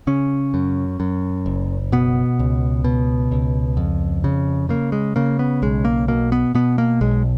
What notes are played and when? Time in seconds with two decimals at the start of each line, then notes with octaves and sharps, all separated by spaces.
0.07 C#3 C#4
0.54 F#2
1.00 F#2
1.46 F#1
1.92 B2 B3
2.39 C#2
2.84 B2
3.31 C#2
3.77 F2
4.24 C#3
4.69 C#3 A#3
4.92 G#3
5.16 C#3 A#3
5.39 B3
5.62 B1 G#3
5.85 A#3
6.08 B2 A#3
6.32 B3
6.55 B2 B3
6.78 A#3
7.01 B1 G#3